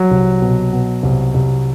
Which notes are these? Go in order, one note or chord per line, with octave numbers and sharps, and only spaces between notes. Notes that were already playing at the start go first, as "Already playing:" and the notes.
Already playing: F#3
C2
B2
B2
C2
C2